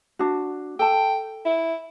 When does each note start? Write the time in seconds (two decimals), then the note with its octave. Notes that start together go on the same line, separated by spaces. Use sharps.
0.19 D4 F#4
0.79 A4 G5 A5
1.45 E4